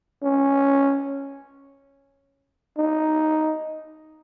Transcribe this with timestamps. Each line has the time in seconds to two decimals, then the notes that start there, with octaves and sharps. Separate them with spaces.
0.23 C#4
2.78 D#4